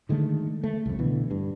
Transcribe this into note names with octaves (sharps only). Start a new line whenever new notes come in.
D3 D#3 G#3 A3
A3
C2 F2
B2 D3 E3
G2